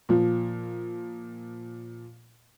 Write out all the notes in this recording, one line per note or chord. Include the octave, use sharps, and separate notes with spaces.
A#2 F3